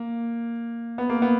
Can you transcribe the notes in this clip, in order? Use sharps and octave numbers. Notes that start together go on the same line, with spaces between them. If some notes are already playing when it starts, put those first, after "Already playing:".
Already playing: A#3
B3
A#3
B3